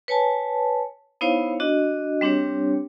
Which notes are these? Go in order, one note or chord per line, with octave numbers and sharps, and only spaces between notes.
B4 C#5 G#5 A5
B3 D#4 E4 C5 C#5 F5
D4 F#4 D#5
G3 C4 D4 G4 C#5